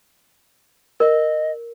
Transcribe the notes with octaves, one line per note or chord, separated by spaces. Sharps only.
A#4 D#5